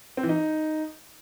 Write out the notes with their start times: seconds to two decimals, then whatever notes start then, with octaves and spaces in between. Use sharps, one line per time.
0.17 C4
0.23 E3
0.29 D#4